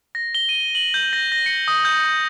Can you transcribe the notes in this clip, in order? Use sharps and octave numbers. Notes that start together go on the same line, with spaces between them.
A#6
G7
D#7
F#7
G6
A#6
A#6
C#7
D#6
G6